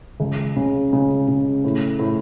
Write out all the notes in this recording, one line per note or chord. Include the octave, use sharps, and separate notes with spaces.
C#2
C#3
C#3
C#3
A2
A2